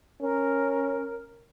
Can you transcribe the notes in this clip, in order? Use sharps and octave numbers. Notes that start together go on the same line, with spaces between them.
C#4 A#4